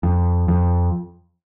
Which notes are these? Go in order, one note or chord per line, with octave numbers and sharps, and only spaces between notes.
F2
F2